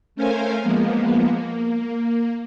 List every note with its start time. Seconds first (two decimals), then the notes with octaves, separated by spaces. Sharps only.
0.16 A3 C#4 A#4 C5 F5 G#5
0.62 F3 G#3 A#3 B3
1.32 A#3